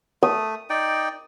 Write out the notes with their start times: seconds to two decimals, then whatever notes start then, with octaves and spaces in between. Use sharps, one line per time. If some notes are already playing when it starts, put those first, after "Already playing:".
0.23 A3 D#6
0.70 D#4 D5 G5